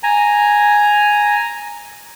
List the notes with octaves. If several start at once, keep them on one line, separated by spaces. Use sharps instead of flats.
G#5 A#5